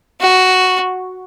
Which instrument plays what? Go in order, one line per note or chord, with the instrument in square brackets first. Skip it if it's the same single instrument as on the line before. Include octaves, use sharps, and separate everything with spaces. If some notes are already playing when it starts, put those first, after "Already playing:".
[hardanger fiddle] F#4